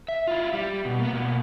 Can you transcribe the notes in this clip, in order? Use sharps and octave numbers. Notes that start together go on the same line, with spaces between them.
E5
E4 F4
G3
B2
A#3 B3
B2 A#3